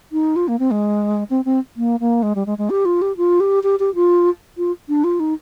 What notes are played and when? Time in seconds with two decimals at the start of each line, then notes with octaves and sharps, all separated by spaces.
0.12 D#4
0.36 F4
0.48 A#3
0.59 C4
0.71 G#3
1.30 C4
1.45 C4
1.77 A#3
2.00 A#3
2.23 G#3
2.35 G3
2.46 G#3
2.58 G#3
2.70 G4
2.85 F4
3.02 G4
3.17 F4
3.40 G4
3.63 G4
3.80 G4
3.95 F4
4.58 F4
4.89 D4
5.04 F4
5.20 D#4